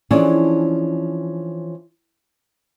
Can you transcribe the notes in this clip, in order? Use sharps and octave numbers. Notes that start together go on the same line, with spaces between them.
E3 F3 C#4 D4 G#4 A4